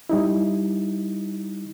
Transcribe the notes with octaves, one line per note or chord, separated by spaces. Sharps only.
G3 D#4 E4